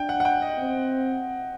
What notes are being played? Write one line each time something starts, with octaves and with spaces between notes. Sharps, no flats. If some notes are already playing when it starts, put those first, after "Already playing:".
Already playing: D4 G5
F#5
F#5
G5
D#5
C4